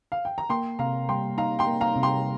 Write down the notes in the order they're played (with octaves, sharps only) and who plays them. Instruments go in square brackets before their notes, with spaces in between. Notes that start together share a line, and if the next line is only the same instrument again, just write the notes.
[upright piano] F5
G5
A#5
[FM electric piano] A#3 [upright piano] G5 C6
[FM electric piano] C3 [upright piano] F5 A#5
[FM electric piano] G3 [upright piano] G5 C6
[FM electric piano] D#4 [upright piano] F5 A#5
[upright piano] G5 C6
[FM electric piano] A#3
[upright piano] F5 A#5
[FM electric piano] C3
[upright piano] G5 C6